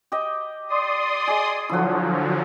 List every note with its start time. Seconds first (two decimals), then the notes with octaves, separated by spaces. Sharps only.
0.12 G4 D#5
0.69 D5 C6 D#6
1.27 G#4 D#5
1.69 D3 F3 F#3 E4 F#4